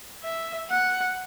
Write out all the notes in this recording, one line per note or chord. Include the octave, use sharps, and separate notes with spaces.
E5
F#5